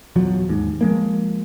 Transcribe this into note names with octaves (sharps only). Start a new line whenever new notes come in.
A#1 E2 F3 F#3
D#2 G#2
F3 G#3 A#3